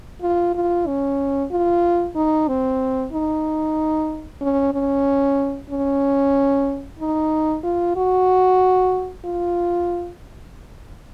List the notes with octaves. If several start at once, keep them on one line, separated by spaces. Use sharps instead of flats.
F4
F4
C#4
F4
D#4
C4
D#4
C#4
C#4
C#4
D#4
F4
F#4
F4